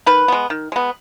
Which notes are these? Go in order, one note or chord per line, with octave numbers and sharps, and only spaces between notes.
D#3 B4
G#3 B3
D#3
G#3 B3